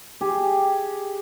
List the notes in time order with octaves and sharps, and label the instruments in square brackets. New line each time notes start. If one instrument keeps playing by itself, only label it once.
[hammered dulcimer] G4 G#4